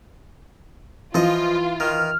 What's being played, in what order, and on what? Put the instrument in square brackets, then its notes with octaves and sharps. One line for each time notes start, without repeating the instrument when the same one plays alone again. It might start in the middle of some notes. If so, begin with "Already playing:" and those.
[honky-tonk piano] E3 [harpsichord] F3 D#5 [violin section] F4
[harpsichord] D#3 [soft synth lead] F6